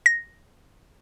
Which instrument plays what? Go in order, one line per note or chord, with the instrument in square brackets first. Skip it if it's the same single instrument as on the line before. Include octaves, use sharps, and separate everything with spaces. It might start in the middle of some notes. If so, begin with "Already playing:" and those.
[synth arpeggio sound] A#6